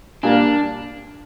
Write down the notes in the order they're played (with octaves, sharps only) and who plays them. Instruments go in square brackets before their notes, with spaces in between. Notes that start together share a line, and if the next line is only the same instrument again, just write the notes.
[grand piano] A#2 G3 A#3 [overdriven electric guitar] D4